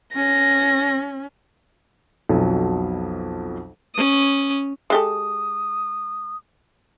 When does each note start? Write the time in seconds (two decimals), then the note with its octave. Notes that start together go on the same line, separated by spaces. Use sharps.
0.16 C#4 A#6
2.29 B1 F2 B2 F#3
3.94 C#4 D#6
4.90 G#3 G4 A4 D#6